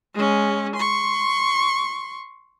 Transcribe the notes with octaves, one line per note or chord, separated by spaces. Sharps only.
G#3 C#4
C6 C#6